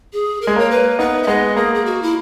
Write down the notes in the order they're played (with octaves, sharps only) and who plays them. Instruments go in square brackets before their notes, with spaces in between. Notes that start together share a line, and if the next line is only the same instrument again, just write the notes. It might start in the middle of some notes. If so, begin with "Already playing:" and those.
[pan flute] G#4
A#4
[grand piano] G#3
[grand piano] A#3 [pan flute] C#5
[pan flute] B4
[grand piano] B3 D#4 [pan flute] B4
[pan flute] E5
[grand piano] G#3 B3 [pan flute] D#5
[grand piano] A#3 [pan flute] G#4
[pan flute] G#4
F#4
E4